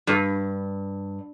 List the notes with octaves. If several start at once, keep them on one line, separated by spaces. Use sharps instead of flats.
G2